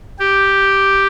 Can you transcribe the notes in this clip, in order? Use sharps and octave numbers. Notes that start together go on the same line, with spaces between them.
G4